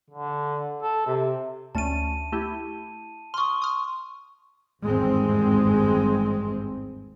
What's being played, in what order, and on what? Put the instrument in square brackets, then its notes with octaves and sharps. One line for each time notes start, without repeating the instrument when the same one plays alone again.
[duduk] D3
A4
C3
[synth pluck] D2 A3 C#4 [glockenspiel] A5 D#7
[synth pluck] A3 E4 G4
[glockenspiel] C6 C#6 [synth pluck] D#6 F6
[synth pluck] D#6 F6
[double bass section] G#1 E2 G2 G#3 C4